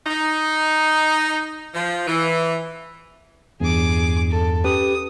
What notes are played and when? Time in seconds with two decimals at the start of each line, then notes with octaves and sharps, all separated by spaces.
0.07 D#4
1.74 F3
2.07 E3
3.60 E2 G2 G#4 D6
4.30 A4
4.64 C#4 G4 B4 D#6